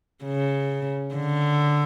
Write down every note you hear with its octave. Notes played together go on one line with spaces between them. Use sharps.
C#3
D3